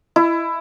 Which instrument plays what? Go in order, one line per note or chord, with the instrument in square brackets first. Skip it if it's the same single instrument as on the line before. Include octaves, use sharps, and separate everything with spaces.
[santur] E4